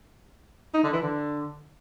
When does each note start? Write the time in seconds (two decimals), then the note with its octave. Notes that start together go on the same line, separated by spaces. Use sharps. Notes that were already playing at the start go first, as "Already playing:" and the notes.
0.74 D#4
0.83 D3
0.93 E3
1.02 D3